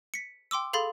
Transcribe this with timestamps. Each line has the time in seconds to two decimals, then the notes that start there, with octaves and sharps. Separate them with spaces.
0.14 B6 C#7
0.51 G5 C6 D6 E6
0.73 G#4 A4 F5 B5 C6 A6